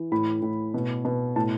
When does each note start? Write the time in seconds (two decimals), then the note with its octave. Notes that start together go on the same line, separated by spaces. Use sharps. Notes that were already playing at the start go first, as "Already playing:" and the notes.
Already playing: E3
0.12 A2 B5
0.42 A2
0.74 B2
1.05 B2
1.36 A2 A5